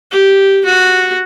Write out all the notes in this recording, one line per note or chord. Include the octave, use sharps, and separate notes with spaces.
G4
F#4